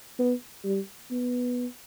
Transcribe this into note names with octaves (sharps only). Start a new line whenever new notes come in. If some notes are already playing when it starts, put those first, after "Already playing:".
B3
G3
B3